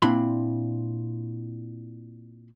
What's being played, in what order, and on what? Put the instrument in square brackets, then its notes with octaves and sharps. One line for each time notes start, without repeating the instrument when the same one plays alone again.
[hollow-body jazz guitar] A#2 C4 D4 E4 B5 C6